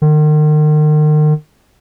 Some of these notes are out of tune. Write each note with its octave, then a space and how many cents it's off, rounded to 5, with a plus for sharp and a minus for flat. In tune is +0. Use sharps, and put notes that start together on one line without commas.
D#3 -40